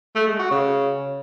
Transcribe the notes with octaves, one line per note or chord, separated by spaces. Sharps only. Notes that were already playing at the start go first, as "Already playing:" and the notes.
A3
G#3
F#4
C#3